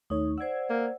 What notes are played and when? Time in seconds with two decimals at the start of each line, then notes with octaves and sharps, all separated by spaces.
0.10 D#2 A3 D#4 C#5
0.38 C5 D5 F#5 E6 G#6
0.70 A#3